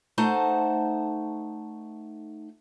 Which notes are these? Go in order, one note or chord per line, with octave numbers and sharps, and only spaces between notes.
A3 D#4 C5 F#5 A5